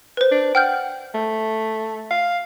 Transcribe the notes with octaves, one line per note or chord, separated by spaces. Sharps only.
B4 C5
D4
F#5 G5 F6 G6
A3
F5